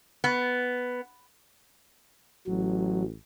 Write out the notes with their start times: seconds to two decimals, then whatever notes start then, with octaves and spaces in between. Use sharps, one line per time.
0.24 B3
2.47 A1 F#3